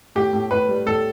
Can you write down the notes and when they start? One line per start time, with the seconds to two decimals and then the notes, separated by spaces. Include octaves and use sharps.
0.15 A2 G4
0.33 A2
0.51 A2 B4
0.68 G3
0.86 A2 A4